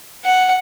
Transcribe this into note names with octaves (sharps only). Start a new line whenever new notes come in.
F#5